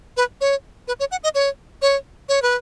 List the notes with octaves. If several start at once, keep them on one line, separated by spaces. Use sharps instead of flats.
B4
C#5
B4
C#5
F#5
D#5
C#5
C#5
C#5
B4